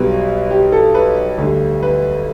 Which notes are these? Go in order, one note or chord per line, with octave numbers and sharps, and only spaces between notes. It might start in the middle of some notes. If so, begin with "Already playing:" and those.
Already playing: B1 B2 G3 B4
G4
A4
B4
D2 D3 G3
B4